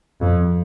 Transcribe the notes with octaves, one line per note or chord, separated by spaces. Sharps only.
F2